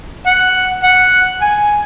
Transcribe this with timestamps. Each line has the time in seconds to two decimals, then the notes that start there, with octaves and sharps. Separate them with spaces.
0.26 F#5
0.83 F#5
1.42 G#5